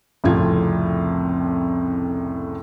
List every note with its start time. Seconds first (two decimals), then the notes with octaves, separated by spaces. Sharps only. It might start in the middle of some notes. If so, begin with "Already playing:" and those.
0.24 C2 F2 A2 C#3 F4 G#6